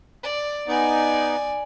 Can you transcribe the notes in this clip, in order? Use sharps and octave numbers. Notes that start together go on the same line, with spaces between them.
D5
B3 D#4 D5 G#5